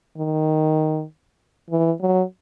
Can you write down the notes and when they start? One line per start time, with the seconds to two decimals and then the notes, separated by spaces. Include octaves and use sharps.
0.18 D#3
1.70 E3
2.01 F#3